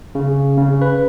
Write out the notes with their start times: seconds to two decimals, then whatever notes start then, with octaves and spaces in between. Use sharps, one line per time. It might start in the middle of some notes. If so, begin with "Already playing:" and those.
0.15 C#3
0.58 C#3
0.82 B4